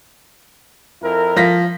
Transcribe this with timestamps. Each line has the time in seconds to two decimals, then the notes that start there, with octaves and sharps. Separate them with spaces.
1.03 F2 E4 A#4
1.36 F3 A#6 B6